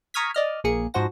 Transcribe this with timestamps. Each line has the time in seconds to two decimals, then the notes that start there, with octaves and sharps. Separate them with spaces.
0.14 A#5 C#6 D#6 F6 G#6 B6
0.34 D5 D#5 F6
0.64 A#1 A#3 G#4 C#7
0.94 G#2 F3 F#4 C5 F#5 A#6